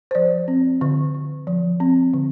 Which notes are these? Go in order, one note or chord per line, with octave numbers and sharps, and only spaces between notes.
C5
F3 D5
C4
D3
D3
F3
C4
D3